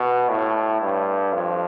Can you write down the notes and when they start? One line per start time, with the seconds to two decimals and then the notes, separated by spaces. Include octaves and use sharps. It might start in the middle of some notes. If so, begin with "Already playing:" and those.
Already playing: B2
0.29 A2
0.81 G2
1.33 F2